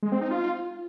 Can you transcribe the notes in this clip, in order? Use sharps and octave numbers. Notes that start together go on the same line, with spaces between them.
G#3
C4
D#4
F4